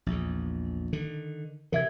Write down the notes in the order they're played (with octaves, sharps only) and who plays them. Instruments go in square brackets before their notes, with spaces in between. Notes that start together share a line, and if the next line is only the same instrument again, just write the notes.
[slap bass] A#1 E2
D3 D#3
[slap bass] C3 E3 [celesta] A#4 E5 G#6